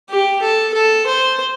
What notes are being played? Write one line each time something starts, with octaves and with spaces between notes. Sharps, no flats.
G4
A4
A4
C5